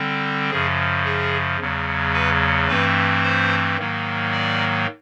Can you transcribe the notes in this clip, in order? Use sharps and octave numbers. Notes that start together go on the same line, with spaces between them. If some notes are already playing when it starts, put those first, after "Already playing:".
Already playing: D3 G3 C4
F#2 C#3 F3 G#4
G#4
E2 C#3 F#3
B4
G2 E3 A3 C4 B4
C5
G#2 D#3 F#3 A#3
D5